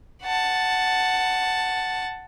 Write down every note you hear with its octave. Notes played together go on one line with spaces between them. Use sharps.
F#5 A5